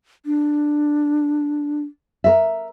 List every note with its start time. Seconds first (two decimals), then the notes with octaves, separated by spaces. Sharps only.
0.26 D4
2.24 A#4 E5